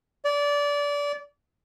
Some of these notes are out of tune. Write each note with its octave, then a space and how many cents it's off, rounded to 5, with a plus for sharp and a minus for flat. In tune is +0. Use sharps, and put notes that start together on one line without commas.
D5 -25